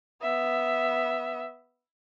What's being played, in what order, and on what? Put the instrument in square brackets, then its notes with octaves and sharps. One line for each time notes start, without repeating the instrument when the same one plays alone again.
[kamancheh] B3 E5